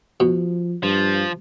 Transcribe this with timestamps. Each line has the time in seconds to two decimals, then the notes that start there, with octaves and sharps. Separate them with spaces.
0.20 B2 F3
0.83 G2 F3